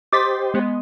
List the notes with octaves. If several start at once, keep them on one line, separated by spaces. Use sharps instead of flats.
G4 C5 D#5 C6 D6 A6 B6
G#3 B3